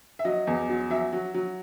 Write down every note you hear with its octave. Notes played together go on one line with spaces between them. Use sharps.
E5
F#3 D#5
E2
F#3
F#3 E5
F#3
F#3